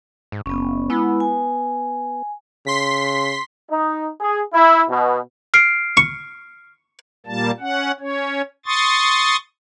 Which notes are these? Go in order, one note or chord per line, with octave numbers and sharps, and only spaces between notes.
G#2
F#1 B3 C#4
G#3 B3 E4 B5
G#5
C#3 C6 B6
D#4
G#4
E4
B2
F6 C7 D7
C#6
A#2 G3 A#3 A5
C#4 F#5
C#4 C#5
C6 C#6 D#6 A6